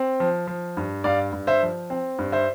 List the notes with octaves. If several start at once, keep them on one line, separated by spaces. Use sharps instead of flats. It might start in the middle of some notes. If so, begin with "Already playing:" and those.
Already playing: C4
F3
F3
G2
G2 D5 F5
G2
C5 E5
F3
C4
G2
C5 E5